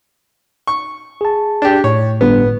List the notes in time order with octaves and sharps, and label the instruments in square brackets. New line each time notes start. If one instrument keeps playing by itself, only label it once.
[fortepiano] C#6
[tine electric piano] G#4 A5
[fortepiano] D4 G4
[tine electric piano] A2 [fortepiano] C#5
[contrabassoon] G1 [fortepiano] B3